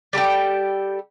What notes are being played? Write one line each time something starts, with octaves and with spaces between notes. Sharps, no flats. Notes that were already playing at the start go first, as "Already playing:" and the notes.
G3 G4 A4 G5